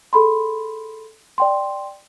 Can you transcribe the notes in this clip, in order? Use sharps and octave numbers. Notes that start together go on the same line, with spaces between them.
G#4 A4 B5 C6
D5 G5 C6